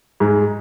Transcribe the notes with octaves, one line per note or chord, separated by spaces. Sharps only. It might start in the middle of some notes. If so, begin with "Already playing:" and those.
G#2 G#3